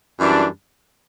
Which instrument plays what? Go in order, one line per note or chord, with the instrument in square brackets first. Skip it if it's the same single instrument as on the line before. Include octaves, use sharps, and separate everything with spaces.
[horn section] F#2 E3 G3 D4